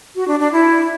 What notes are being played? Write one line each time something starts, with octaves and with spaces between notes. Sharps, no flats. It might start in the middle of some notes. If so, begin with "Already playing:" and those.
F#4
D4
D4
E4